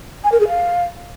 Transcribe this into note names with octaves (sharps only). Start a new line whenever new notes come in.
G#5
A#4
G#4
F5